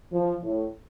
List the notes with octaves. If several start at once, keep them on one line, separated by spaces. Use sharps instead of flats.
F3
A2